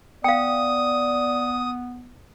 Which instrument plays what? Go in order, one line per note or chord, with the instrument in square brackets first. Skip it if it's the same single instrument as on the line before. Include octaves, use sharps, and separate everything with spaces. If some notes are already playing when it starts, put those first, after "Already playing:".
[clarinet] B3 [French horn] D5 [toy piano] F5 G5 [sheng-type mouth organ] D#6